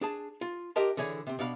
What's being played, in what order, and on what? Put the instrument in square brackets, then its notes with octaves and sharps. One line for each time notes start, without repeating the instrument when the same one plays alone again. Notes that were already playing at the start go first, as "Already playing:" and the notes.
[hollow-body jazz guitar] D4 G#4 A5
F4
D4 G4 A#4 D#5 A5 C6
D3 E3 G#4 C#5 D5
C3 C4
B2 D4 F5 B5